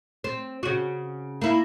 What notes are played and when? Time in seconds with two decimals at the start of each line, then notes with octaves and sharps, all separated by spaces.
0.24 C4
0.63 C#3 F#4
1.41 A#3 E4